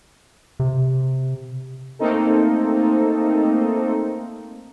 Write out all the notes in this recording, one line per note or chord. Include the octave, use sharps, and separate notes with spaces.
C3
A3 A#3 C4 D#4 A4